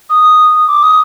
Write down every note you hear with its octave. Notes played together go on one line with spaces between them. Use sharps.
D#6
D6
D#6